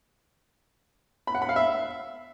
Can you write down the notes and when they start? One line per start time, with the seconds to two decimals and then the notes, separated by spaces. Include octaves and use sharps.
1.27 B5
1.35 F#5
1.42 B5
1.49 F5
1.56 E5